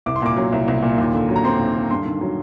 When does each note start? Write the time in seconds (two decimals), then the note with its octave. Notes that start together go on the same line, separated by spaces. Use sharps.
0.06 C2 D6
0.16 C6
0.22 A#2 D6
0.36 F#3
0.53 C2
0.68 C2
0.82 A#2
0.98 D#2
1.13 D3
1.29 F#3
1.36 A#5
1.44 C4 C6
1.60 D#2
1.75 D3
1.90 G2 C6
2.06 D#3
2.21 F#3